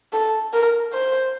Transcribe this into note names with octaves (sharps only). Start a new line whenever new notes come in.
A4
A#4
C5